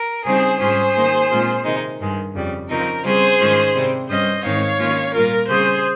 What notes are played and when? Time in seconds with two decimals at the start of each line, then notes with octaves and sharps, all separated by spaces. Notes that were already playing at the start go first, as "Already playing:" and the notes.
Already playing: A#4
0.25 C#3 G3 C4 D#4 G#4 C5
0.60 G#2 G3 C#4 F4 G#4 C5
0.95 D#3 A#3 D#4
1.30 A#2 G#3 C4 F4
1.65 C3 D#3 G#3 D#4
2.00 G2 D#3 G#3
2.35 F2 C#3 G3
2.69 C#3 F3 C4 D#4 A#4
3.04 C#3 G3 C4 F4 G#4 C5
3.40 G#2 D#3 G#3 C#4 F4
3.75 C3 G3 C4
4.08 G2 G3 C#4 C5 D#5
4.43 G#2 D#3 G#3 C4 D#4 C#5 F5
4.78 D#3 A#3 C#4 F4
5.13 A#2 G3 A#3 F4 A#4
5.48 C#3 G3 C4 G#4 C5